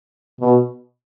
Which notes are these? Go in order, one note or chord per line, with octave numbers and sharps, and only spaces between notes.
B2